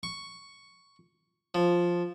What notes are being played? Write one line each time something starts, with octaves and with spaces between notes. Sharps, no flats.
C#6
F3